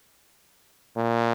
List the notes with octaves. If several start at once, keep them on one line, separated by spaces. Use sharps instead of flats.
A#2